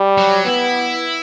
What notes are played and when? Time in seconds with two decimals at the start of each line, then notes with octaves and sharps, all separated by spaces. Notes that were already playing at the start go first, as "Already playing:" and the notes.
Already playing: G3
0.17 F#3
0.45 B3 E4